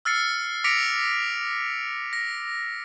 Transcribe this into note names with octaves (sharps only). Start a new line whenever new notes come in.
E6 F6 A6 C7 C#7
D6 A#6 B6 C#7 D7 F7
A#6